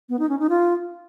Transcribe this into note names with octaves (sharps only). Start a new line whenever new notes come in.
B3
D#4
C#4
D#4
F4